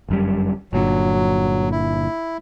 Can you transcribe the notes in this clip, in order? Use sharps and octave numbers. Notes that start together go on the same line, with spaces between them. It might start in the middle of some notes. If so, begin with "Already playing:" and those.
G1 F#2 G3
G1 A#2 D3 F#3
E4